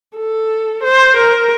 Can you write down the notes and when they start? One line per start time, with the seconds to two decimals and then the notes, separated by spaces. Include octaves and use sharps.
0.16 A4
0.83 C5
1.16 A#4